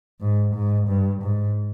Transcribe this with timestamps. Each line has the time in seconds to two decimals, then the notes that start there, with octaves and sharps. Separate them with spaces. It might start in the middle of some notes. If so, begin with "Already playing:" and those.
0.21 G#2
0.55 G#2
0.89 G2
1.23 G#2